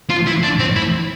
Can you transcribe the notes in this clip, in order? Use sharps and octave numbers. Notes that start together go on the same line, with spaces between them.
F4
E4
D4
C4
E4